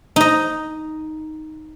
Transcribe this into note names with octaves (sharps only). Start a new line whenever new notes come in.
D#4 D#5